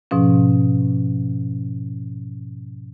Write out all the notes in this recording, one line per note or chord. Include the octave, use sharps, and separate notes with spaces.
G#2 B2 F3 C#4